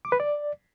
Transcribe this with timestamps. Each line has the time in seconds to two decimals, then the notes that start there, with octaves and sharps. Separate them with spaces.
0.05 D6
0.12 B4
0.20 D5